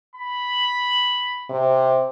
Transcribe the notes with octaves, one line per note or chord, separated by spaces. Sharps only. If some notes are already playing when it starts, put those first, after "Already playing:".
B5
C3